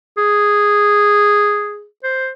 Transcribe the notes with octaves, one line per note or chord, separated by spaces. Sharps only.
G#4
C5